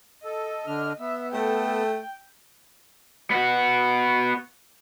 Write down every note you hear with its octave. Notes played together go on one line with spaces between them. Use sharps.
A4 D#5
D3 D4 F6
B3 E5
A3 A4 G5
B3 F#4